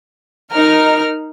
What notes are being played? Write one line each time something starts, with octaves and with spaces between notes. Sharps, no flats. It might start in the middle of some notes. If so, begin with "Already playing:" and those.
D#4 A#4 F6